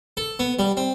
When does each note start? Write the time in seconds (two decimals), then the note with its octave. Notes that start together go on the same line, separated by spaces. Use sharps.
0.17 A4
0.39 B3
0.59 G3
0.77 C4